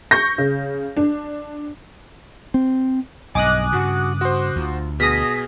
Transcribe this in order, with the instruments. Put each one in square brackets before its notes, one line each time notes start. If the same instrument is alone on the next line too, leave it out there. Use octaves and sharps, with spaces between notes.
[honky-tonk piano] C#6 G6 A#6
C#3
D4
[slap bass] C4
[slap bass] B1 G2 [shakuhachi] D#5 [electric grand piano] G#5 [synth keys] D6 D#6 F#6
[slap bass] G2 C#3 [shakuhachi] F#4
[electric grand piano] F#4 C5 [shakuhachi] C6
[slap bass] D2 [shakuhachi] F4
[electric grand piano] B2 [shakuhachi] G#4 [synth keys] D#6 A#6 B6